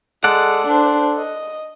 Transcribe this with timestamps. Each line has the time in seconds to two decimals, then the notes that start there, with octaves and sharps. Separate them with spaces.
0.24 G#3 A4 D5 F#5
0.67 D4 C5
1.17 D#5